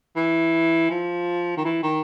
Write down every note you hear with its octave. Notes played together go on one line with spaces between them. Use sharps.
E3
F3
D#3
E3
D#3